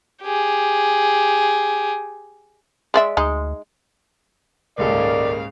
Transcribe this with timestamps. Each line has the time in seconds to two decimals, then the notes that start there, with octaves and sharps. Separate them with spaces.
0.22 G4 G#4
2.94 G#3 D5 E5
3.17 D2 G#3 D#4
4.78 D#1 C#2 G#2 C#3 A4 A#4 D5 F5